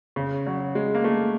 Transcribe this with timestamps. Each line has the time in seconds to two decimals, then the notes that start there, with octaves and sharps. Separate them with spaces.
0.16 C#3
0.47 F#3
0.75 G#3
0.94 A#3
1.04 A3